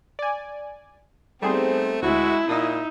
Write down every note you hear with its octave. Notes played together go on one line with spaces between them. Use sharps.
D5 G#5
G3 A3 B3 C4 D#4 G#4 C5
D2 G#3 E4 F#4 E5
A#2 D#4 E5 D#6